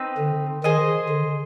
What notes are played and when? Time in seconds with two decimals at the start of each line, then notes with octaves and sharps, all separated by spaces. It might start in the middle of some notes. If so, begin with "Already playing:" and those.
Already playing: C4 D#4 B4
0.18 D3
0.64 D#3 G#4 C5 D#5
1.10 D3